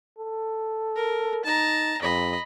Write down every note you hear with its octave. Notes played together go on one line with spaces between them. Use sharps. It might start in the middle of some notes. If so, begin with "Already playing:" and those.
A4
A#4
D#4 A5 A#5
F2 D#5 B5